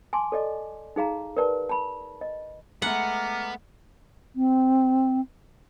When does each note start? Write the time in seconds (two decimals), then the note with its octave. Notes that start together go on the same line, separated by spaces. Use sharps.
0.13 G#5 A5 C6 D6
0.32 A4 D5 D#5
0.96 D#4 G#4 F5 A#5
1.37 A#4 B4 D5 A5
1.69 A5 B5
2.21 D#5
2.82 G#3 A3 B3 F#5 A#5 D6 F6
4.36 C4